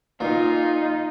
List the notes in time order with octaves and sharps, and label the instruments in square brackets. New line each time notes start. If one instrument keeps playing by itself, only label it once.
[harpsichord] A#2 [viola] D#4 [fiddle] F4